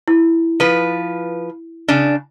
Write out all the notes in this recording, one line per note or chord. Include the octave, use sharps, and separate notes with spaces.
E4
F3 B4
C#3 D4